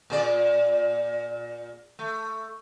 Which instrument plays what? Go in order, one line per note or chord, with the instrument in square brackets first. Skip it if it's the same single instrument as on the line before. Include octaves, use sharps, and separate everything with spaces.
[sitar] A#2 G#4 D5
A3